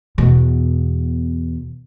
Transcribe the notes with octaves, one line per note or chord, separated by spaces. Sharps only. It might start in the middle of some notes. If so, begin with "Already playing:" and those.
E2 B2